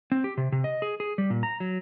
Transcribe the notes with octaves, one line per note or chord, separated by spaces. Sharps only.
C4
G4
C3
C3
D#5
G#4
G#4
G3
A#2
A#5
F#3